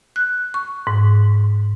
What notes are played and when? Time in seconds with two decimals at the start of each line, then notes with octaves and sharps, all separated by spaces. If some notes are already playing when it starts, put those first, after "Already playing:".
0.16 F#6
0.54 C#6
0.87 G#2